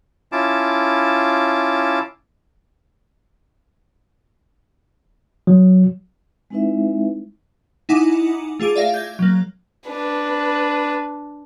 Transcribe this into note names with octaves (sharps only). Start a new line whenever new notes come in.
C#4 E4 F4 A5 D6
F#3
G#3 C4 D#4 E4 B4 E5
D#4 E4 F#5 G#5 D6 D#6
A3 F4 G#4 D6 D7
D5 E5 F5 A#6
G6 G#6
F#3 A#3
D4 B4